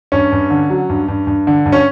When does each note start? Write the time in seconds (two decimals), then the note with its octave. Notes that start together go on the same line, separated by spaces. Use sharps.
0.12 G2 C#4
0.32 G2
0.50 D3
0.70 F#3
0.90 G2
1.08 G2
1.27 G2
1.47 D3
1.66 G2
1.72 C#4